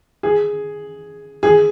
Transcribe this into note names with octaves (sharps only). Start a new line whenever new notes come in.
G#4
G#4